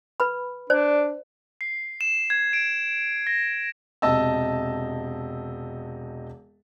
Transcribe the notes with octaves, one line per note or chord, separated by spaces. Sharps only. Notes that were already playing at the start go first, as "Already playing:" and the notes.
B4 B5
D4 C5 D5
C7
E7
G#6
D7
A#6
E1 C3 D#5 A5 E6